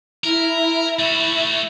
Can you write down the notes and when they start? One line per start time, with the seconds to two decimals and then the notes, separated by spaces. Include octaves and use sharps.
0.24 E4 A#4
0.99 A3 F#4